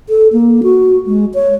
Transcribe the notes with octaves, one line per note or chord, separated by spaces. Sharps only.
A4
A#3
F#4
G#3
C#5